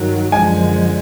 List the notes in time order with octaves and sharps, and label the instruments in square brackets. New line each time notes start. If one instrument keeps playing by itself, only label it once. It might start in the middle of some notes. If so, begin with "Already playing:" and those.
Already playing: [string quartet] G2 D#3 F#3
[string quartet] F#2 D3 F3 G#3 [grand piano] G#5